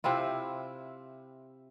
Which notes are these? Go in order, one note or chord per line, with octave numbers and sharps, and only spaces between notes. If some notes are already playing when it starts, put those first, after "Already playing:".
C3 C4 E4 F4